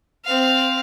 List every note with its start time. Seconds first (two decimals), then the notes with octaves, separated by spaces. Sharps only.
0.25 C4 F5